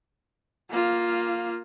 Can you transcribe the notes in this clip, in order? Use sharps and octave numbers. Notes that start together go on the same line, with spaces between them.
A#3 F4